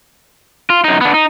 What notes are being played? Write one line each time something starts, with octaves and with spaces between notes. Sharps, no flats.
F4
F#2 D#4
B3 D4
D#4